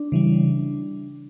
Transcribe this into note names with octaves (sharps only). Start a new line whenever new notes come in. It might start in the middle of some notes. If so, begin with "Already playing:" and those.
Already playing: D4
C#3 E3 G3